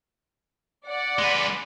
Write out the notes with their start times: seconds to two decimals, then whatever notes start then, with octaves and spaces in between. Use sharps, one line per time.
0.87 D5 F#5
1.19 G#3 B4